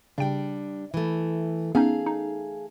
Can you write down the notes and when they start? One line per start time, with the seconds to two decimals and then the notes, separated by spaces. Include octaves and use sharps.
0.18 C#3 G3 D4 G5
0.94 E3 A3
1.75 A3 B3 C#4 D#4 G#4 F5
2.06 D#4